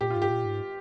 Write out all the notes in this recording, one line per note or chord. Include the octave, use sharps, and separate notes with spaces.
A#2 G4
F4
G#2
G4
A#2
G#2